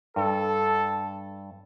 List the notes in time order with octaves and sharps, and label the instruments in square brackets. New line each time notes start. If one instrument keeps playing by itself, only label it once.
[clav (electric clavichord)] G2 [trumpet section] A4